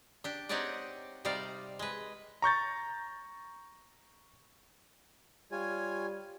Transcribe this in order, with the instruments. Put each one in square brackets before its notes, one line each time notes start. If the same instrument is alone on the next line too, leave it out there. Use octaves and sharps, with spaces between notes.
[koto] D4 G4
C4 D#4 G4 C#5 D5 F#5
C3 G3 D#4 D5 F5
G#3 B4
[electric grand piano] A#5 C#6 G6 A6
[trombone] G3 [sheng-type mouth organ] F4 C#5 G#5